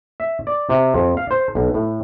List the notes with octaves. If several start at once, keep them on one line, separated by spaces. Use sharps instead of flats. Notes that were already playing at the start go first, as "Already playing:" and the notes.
E5
D5
C3
F2
F5
C5
B1
A2